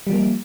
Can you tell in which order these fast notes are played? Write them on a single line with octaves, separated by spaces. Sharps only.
G3 F3 A#3